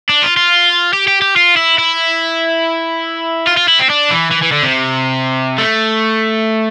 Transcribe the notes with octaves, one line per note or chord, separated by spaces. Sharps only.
D4
F4
F4
G4
G4
G4
F4
E4
E4
F4
F4
E4
C4
D4
E3
E3
E3
D3
C3
A3